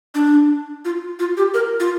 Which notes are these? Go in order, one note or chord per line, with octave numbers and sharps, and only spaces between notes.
D4
F4
F4
G4
A#4
F4